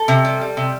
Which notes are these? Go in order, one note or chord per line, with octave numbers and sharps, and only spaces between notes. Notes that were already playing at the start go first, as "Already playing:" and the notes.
Already playing: A4
C3
G3
G3
C3